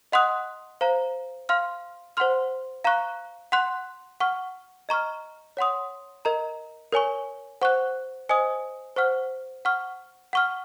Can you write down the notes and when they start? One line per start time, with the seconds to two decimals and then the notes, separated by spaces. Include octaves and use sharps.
0.12 D#5 F#5 C6 D#6 F#6
0.81 C5 F5 A#5
1.49 F5 C6 F6
2.17 C5 F#5 C6 F6
2.84 F5 A#5 C#6 F#6
3.52 F#5 C6 F#6
4.20 F#5 C#6 F6
4.89 D#5 A#5 C#6 F6
5.57 C#5 F#5 C6 D#6
6.25 A#4 D#5 A#5
6.92 A#4 C#5 G#5 C#6
7.62 C5 F#5 C#6 F#6
8.29 C5 D#5 G#5 D#6
8.96 C5 F#5 C#6 F6
9.65 F#5 C#6 F6
10.33 F#5 C#6 F6